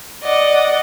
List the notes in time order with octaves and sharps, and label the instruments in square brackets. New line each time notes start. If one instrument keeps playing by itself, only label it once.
[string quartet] D5 D#5 F#5